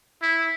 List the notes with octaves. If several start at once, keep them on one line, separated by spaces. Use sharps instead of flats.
E4